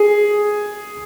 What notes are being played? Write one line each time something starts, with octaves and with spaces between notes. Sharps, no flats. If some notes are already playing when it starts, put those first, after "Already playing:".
Already playing: G#4